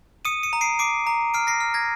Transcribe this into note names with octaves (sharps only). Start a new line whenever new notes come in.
D#6 C#7 D#7
C#7 D#7
A#5
C7 D7
D6 C7 D7
A#5
F6 C7 D7
A#6 C7
F6
G#6 A#6